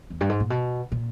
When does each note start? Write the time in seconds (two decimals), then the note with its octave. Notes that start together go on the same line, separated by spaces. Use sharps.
0.10 E2
0.21 G2
0.29 G#2
0.40 A#2
0.50 B2
0.92 A#2